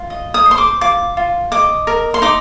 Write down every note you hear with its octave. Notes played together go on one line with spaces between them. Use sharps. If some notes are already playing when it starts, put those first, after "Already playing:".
Already playing: F4
D#5
D#6
C5
C6
D6
F4 D6
F4
D#5 D6
A#4
C6
D#4 D6